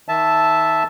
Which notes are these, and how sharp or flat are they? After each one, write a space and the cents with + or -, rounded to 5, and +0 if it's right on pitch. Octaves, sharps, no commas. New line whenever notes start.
D#3 +25 E5 +0 A5 -5